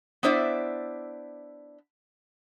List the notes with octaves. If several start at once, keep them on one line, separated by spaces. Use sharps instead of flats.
B3 D4 E4 C5 D5 E5